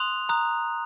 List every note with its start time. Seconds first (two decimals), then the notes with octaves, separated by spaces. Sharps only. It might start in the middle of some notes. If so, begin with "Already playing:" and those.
Already playing: C6 D#6 F#6 F7
0.29 A#5 D#6 F#6